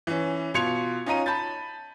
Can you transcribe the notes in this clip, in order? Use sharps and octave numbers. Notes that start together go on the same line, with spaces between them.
E3 C#4
B2 F4 C6 G#6 C#7 F7
C#4 D#4 F4 D#5 A#5 D#7
A5 B5 G6 A6